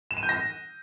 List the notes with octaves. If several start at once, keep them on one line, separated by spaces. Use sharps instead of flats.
E7
D#7
G6
A#6